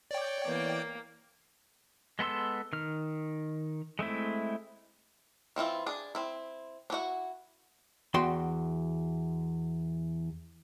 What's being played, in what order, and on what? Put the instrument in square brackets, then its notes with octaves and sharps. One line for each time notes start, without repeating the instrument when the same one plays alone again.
[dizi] C#5 [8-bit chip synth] D5 G5
[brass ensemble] E3 B3 [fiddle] A#3
[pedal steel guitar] G#3 B3 A4 C6 E6
D#3 F6
G#3 A3 C4 E4
[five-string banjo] E3 C4 E4 F4
D4 G#4
C4 E4
D4 E4 F#4 F#5
[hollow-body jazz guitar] E2 F#4 G5 C6